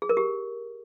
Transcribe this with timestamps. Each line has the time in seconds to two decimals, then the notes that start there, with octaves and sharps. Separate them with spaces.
0.02 G#4
0.09 A#4
0.17 G4